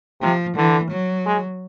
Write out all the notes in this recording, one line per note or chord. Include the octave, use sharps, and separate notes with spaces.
C3 F3
D3 E3
F#3
G#3